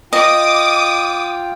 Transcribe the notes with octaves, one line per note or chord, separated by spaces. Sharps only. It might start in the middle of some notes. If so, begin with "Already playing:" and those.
F4 D#5 G5 D6 D#6